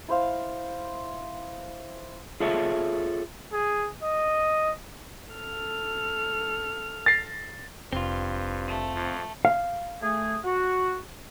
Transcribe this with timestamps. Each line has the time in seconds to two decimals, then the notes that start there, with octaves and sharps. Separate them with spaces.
0.08 E4 C5 F5
2.40 F4 G#4 A4 C#5 E5
3.52 G#4
4.02 D#5
5.33 A4 F6
7.06 A6 A#6 C7
7.93 F1 G2 C4 F4
8.67 A3
8.96 F2
9.45 F5
10.02 A3 G#4
10.45 F#4